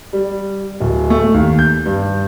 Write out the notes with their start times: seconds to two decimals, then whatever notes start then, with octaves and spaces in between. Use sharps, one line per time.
0.13 G3
0.80 D1
1.10 A3
1.34 D#2
1.59 G6
1.86 G2